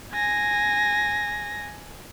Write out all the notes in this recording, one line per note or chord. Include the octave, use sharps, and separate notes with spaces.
G#5 A#6